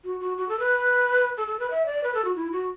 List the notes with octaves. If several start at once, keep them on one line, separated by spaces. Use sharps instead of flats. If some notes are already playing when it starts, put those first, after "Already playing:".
F#4
F#4
F#4
A4
B4
A4
A4
B4
E5
D5
B4
A4
F#4
E4
F#4